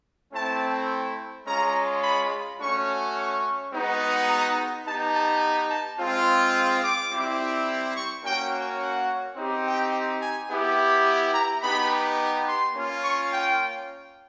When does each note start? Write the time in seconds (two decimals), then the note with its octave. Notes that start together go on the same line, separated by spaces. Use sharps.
0.33 A3 C4 E4 A5
1.46 G#3 C#4 F4 A#5
2.03 B5
2.59 A3 C#4 F#4 C#6
3.15 C#6
3.72 G#3 B3 D#4 F#4
4.28 A#5
4.85 B3 D#4 G4 A5
5.13 A5
5.69 A5
5.99 G#3 C4 F4
6.83 D6
7.11 G3 C4 E4 G4
7.96 C#6
8.23 A#3 C#4 F#4 G5
8.81 F#5
9.36 C4 D#4 G4
9.65 G5
10.21 G#5
10.49 B3 E4 G4
11.34 A#5
11.62 B3 D#4 G4 B5
12.47 C6
12.75 A#3 C#4 F4
13.04 C#6
13.32 G5